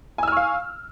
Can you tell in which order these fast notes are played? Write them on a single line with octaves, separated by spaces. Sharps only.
G#5 E6 F6 C#6 F5